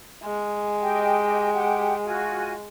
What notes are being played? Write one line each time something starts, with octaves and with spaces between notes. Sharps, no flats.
G#3
G4 D#5 G5
G4 F#5 G5
F4 F#4 G#5